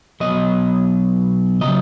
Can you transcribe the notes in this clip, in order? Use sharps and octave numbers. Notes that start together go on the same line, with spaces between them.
B1 B2 F#3 D#5
C#3 F#3 D#5